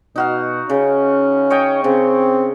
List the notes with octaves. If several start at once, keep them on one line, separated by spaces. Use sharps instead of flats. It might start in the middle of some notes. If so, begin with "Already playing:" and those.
B2 D#4 F#4 F5
C#3 C#4
C#5 D#5 G5
C#3 C4